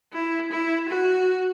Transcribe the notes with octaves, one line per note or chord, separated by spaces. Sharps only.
E4
E4
F#4